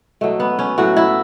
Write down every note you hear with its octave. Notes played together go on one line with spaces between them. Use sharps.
B2 F#3 A3
B3
C#4
A2 F#3 F#4
E4